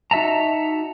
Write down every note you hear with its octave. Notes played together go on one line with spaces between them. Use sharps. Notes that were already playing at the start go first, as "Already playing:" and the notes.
D#4 F#4 E5 A5 A#5